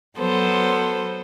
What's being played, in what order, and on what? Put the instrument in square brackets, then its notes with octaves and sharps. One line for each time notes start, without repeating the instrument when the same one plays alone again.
[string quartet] F#3 B3 A4 C5